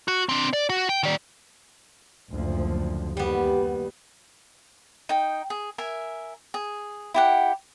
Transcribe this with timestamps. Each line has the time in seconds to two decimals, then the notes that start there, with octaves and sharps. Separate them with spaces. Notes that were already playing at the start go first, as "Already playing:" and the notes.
0.08 F#4
0.29 C4 D4
0.53 D5
0.69 F#4
0.89 G5
1.03 D#3 D5
2.31 F#1 D2 F3
3.17 D#2 G3 B3 G4
5.09 D#4 G5
5.50 G#4
5.78 A#4 E5 G#5
6.54 G#4
7.14 E4 G4 F#5